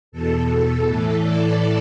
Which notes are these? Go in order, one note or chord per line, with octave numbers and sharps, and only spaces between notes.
E2 B2 A4
A2 E3
D5